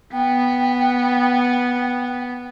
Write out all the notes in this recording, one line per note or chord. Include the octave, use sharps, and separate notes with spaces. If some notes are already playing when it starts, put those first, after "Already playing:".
B3 G5